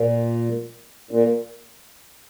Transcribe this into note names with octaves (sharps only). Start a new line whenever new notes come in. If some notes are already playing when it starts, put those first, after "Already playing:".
Already playing: A#2
A#2